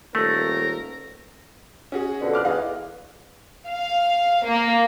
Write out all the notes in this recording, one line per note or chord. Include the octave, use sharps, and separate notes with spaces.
D#1 A3 A4 A#4
C#4 F#4 G#4
F2 B2 D3
D6 F6 F#6
E2 D#5 F5
F5
A#3